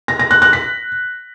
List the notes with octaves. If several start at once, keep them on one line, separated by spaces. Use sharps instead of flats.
A#6
A#6
F#6
F#6
B6